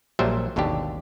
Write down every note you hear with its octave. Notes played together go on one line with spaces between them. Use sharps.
A#1 A#2 F#3 G3 C5 E5
G#1 D#2 B2 D3 D4 G4